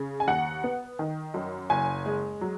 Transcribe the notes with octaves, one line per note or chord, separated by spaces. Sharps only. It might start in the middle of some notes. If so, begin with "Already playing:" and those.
Already playing: C#3
G#5
D#2 F#5
B3
D#3
F#2
F#1 G#5
G#3
F#3